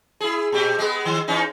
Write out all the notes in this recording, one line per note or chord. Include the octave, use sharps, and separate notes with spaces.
E4 G#4
A#2 G4
G#3 B3
D#3
E3 C#4 D#4